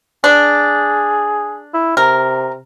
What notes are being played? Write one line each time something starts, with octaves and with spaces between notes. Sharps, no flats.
D4 G#4
E4
C3 A#4